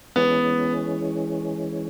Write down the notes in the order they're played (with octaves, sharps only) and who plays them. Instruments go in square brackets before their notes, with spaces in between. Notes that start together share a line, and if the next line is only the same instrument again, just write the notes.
[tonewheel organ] E3 G#3 C#4 [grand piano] B3